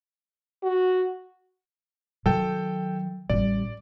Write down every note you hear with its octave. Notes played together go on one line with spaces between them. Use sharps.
F#4
D#3 F#3 A4 G5
A1 G3 D5